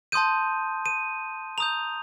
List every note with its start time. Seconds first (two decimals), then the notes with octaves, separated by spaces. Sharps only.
0.12 A5 C6 D#6 G6 D#7
0.86 D#7
1.58 A#5 D#6 G6 F7